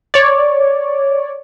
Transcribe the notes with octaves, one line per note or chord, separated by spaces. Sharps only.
C#5 D5